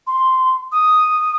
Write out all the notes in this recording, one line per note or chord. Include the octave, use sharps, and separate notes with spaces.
C6
D#6